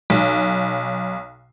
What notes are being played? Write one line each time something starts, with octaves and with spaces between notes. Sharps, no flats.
B1